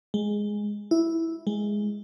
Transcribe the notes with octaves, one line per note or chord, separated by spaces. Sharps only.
G#3
E4
G#3